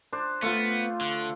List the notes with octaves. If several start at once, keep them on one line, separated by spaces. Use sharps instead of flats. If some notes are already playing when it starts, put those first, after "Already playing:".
D4 C5
A3 B3 F4
D3